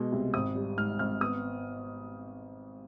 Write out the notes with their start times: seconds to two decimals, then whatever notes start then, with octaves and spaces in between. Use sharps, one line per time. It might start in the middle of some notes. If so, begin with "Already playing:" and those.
Already playing: B2 G#3
0.12 C2
0.34 G#1 D#6
0.55 G3
0.78 G#2 F6
0.99 G#1 F6
1.21 B3 D#6